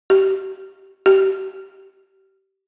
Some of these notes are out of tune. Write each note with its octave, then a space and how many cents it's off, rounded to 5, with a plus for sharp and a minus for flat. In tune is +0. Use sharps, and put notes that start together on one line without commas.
G4 -25
G4 -25